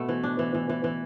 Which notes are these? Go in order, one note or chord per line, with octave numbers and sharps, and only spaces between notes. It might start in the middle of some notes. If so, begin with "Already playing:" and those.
Already playing: B2 A3 B3
E3
D4
E3
E3
E3
E3